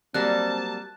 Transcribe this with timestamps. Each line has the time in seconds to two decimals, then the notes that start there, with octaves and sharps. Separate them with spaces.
0.14 F#3 G3 A#3 C4 A5 F#6